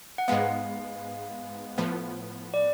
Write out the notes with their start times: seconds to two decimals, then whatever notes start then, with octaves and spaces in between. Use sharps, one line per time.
0.18 F#5
0.28 G#2 G#3 B3 F5
1.78 A2 F3 B3
2.54 D5